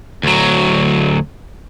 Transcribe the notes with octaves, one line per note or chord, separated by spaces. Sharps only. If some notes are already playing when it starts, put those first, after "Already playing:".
D2 F#3